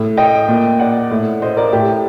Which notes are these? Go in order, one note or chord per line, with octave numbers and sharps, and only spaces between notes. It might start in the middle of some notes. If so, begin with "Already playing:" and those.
Already playing: A2
D#5 G5
A#2
D5 F#5
A2
C5 D#5
A#4 D5
A2 G4